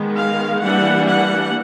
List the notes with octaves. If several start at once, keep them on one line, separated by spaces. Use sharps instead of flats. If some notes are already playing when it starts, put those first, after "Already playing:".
Already playing: D#3 G#3 B3
F5
E3 G3 A#3 D4 F#5
F#5